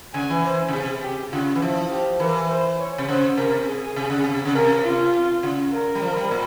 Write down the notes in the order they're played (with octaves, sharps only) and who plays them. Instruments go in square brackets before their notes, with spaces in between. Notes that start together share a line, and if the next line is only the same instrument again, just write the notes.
[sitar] C#3 [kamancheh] G#5
[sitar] E3
[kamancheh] C5
[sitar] C#3
[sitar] C3 [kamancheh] G#4
[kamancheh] G4
[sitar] C#3 [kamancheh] F4
[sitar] E3
[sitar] F3 [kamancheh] E4
[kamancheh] G4
[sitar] E3 [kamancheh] A#4
[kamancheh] C5
C#5
[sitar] C3
[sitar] C#3 [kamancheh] C5
[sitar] C3 [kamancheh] A#4
[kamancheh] G#4
[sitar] C3
C#3
C3
C#3
[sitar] C3 [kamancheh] A#4
[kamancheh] F4
[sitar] C#3
[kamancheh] A#4
[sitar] G3
F3
G3
A#2